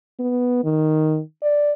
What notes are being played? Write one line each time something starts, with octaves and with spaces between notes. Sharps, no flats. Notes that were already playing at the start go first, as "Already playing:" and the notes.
B3
D#3
D5